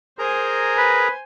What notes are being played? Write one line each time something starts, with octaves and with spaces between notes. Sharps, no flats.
G#4 A#4 C5 G#5 A#5
B4